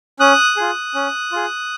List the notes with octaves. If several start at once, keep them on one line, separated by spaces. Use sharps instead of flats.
C#4 D#6 F#6
F4 G#4
C#4
F4 G#4